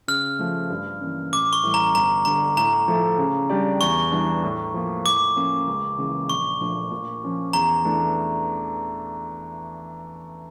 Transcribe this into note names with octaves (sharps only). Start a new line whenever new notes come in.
C#3 F6
F3 A3
G2
E3 A#3 C#4
A1 D6
C#6
A2 E3 G3
A#5
G1 A#5
G2 D3 A#5
A2 A#5
F3 A3 E4 A4
C#3
G3 D4 G4 D5
E2 C#6
E3 G3 D4
A2
F3 A#3
A2 D6
F3 A#3 C#4
C#2
C#3 E3 A#3
A#1 C#6
A#2 F3 A3 D4
A#2
F3 C#4 F4
E2 A#5
E3 A3 D4